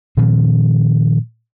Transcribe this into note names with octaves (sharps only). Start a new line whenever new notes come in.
A#2 D#3 F3 C4